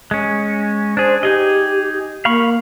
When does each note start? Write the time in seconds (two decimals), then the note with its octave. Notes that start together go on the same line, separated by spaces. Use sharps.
0.11 G#3 C#4
0.97 D4 G#4 C5
1.23 D#4 G4 G#4 D#5
2.25 A#3 F5 B5 C#6